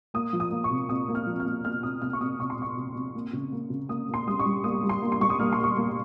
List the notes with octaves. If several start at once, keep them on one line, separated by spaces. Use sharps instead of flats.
A#3 D#6
F3
D#6
A#3
C#6
C3
C3 D#6
A#3
F6
F3
F6
A#3
A#3 F6
C3 D#6
C3 F6
C#6
C3 D#6
C3 C#6
C6
C3 C#6
C3
C3
A#3
C#3
A#3
C#3
A#3 D#6
A#3
C6
G3 D#6
C#6
G3
A#3 D#6
G3
C6
A#3
C6
G3 C#6
D#6
A#3 F6
C6
A#3
C#6
A#3